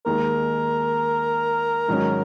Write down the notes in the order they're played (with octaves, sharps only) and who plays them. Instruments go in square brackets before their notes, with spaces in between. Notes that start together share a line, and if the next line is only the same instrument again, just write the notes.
[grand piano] D#2 D#3 G#3 [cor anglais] A#4
[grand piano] G#2 D#3 F#3 C#4